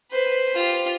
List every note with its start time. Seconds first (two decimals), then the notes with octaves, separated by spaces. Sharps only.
0.12 B4 C5
0.55 F4 G4